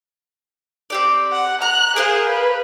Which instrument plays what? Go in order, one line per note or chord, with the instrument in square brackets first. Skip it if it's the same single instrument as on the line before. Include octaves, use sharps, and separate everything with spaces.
[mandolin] C4 G4 D5
[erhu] F#5
[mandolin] A#5 [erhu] F#6
[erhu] G#4 [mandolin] A#4 C5 F5
[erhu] B4